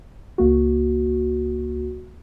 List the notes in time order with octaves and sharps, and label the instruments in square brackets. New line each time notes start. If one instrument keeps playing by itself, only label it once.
[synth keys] C#2 A#3 F#4